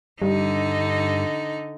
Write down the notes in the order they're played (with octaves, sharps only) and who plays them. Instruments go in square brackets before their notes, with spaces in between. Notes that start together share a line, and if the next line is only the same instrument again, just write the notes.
[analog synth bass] G2 [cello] D3 D#4